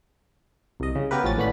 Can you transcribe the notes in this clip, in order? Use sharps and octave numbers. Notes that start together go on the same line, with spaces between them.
C2 D#5
C#3
B3 G4 A#4 B4
A1 F3 C#4 A6
G#1 A2 B3 C#4 D4 B5